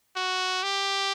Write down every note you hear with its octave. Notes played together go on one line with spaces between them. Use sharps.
F#4
G4